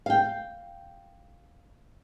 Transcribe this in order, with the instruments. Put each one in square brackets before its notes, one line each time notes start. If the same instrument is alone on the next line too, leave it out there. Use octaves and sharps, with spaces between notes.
[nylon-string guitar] F5 G5